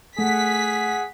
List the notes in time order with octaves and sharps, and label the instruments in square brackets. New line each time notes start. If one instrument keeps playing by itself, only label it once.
[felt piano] A3 [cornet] G#4 [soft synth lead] F#5 [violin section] B6